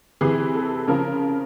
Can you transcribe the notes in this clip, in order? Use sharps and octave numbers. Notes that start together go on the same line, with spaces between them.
C3 E3 G#4
A4
C#3 F3 A#4